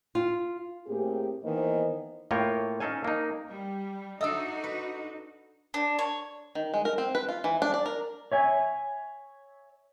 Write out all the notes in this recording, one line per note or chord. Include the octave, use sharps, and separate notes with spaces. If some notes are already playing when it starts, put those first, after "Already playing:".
F4
A2 A#3 C4 G4 G#4
D#3 E3 A#3 B3 C5 D#5
A2 A#3 F4 C#5 G5
C#4 D#4 A4 F5 G#5
A#3 D#4
G3
D4 D#4 F#4 A4 D#5 E5
B4
D4
C#5
D#3
G#3
A#4
C4
B4
F4
E3
D4
D5
A#4
C#5 E5 G#5